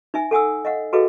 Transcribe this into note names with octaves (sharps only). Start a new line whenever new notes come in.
D#4 E5 G#5
A4 F#5 G#5 D#6 E6
D#5 F5 F#5
F#4 G#4 A4 B4 D#5 F5